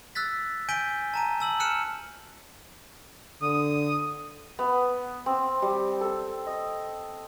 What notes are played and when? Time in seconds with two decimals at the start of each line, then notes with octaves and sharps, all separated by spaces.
0.15 E6 F#6 A6 B6
0.69 G#5 G6 B6 D7 D#7 G7
1.14 A5 A#5 D#7
1.40 A5 E6 F#7
1.60 F6 F#6 C#7 D#7 E7
3.42 D3 D#6
4.59 B3
5.26 C4
5.62 G3
6.01 A4
6.46 D#5